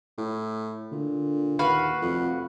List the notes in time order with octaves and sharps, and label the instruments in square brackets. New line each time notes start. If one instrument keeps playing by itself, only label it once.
[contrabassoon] A2
[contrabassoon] A#2 [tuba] D3
[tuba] D#2 [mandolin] F#4 B4 F5
[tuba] F1 [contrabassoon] F2